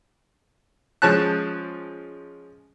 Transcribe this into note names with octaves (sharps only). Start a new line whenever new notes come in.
F3 G#3 C#4 A5 F#6